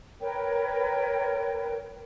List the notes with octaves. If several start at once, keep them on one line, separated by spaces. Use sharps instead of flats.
A#4 B4 C#5 G5